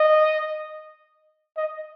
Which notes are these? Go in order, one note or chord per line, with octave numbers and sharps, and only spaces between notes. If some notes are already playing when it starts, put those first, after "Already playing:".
Already playing: D#5
D#5